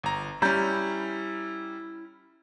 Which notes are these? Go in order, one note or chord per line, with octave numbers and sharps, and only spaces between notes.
G1 A#5
G3 C#4 E4 A#5 G6